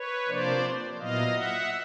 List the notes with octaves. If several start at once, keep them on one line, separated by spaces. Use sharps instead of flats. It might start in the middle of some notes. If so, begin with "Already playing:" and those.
Already playing: B4 C#5
C3 F3 A#3 D4 C5 D5
A#2 F#3 B3 E4 D#5 F5
E5 F#5